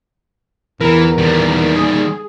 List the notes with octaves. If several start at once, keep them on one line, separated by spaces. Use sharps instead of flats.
E2 E3 A#4
D#3 G3
G#4